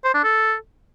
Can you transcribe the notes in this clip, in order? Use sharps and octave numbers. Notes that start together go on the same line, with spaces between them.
C5
D4
A4